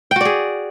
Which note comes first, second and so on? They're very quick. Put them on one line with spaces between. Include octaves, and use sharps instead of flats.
G5 F#4 D5 G#4